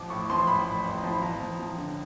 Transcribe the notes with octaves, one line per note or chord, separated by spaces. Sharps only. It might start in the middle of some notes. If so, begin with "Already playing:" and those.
Already playing: A1 F3 D6
A2 C#6
F3 C6
A1 B5
A2
B5
A1
A#5
F3
B5
F3 A#5
F3
F3
D3